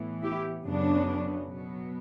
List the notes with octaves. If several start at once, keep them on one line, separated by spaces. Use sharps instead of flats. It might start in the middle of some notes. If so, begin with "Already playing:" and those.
Already playing: A2 E3 B3
E4 G4
F#2 C#3 F#3 B3 D4
B2 F#3 B3